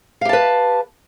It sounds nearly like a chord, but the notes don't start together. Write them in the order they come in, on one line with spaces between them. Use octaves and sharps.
F5 G4 A5 B4